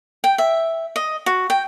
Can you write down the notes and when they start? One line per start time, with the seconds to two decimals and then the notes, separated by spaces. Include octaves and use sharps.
0.24 G5
0.38 E5
0.96 D#5
1.26 F#4
1.50 G5